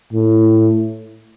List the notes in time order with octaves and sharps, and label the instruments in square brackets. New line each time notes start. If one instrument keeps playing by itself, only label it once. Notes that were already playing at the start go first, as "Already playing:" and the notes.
[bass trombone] A2